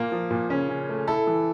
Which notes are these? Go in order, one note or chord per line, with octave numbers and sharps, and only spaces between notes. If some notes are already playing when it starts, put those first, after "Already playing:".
Already playing: A#2 A#3
F3
A#2
C#3 C#4
C#3
A3
E4 A4
E3